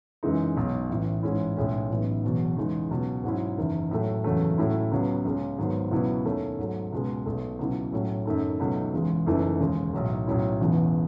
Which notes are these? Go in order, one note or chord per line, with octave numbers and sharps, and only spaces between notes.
F#2 C#3 E3 G#3 D#4
B1 B2 F#3
A1 A2 E3
G#2 E3 G#3 C#4 E4
B1 A2 G#3 C#4
A1 A2 F#3 B3 D#4
E1 E2 B2 F#3
E2 C#3 G#3 D#4
C#2 B2 F#3
G#2 F#3 C#4 E4
F#1 E2 D#3
A2 F#3 A3
F#1 E2 C#3 F#3 A3
A2 F#3 A3 C#4 E4
C#2 C#3 F#3 B3
C#2 C#3 G#3 C#4
G#1 G#2 D#3 F#3 B3
C#2 B2 F#3 B3 E4
D#2 D#3 A3 C#4
G#2 F#3 A3
C#2 B2 G#3
B1 B2 A3
C#2 B2 F#3 C#4 E4
A2 F#3 A3 C#4
F#2 D#3 A3 D#4
C#2 B2 F#3 A3 D#4
E1 E2 C#3 G#3
F#1 F#2 E3 A3 D#4
E1 D#2 C#3 G#3
B1 A2 F#3
B1 A2 F#3 C#4 E4
E1 E2 C#3 E3 B3